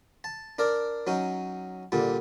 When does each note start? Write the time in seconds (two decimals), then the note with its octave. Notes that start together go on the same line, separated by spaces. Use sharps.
0.24 A5
0.59 D4 A#4 D5
1.07 F#3 C#4 D#4
1.92 A#2 D3 G3